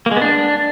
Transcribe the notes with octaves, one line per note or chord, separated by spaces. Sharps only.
A#3
G#3
B3
D4